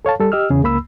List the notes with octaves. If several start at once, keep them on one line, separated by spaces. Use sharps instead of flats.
A4 C#5 F5 A5
G3 A4
G4 D#5 E6 F6
E2 C#3 G#4
C#2 A#3 B5 E6